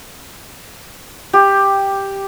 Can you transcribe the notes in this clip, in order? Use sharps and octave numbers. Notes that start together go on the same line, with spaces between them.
G4